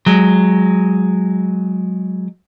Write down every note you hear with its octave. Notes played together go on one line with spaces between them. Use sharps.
F#3 G#3